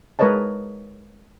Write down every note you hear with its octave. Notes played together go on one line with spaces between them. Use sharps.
G#3 A#4 B4 C#5 D#5 A5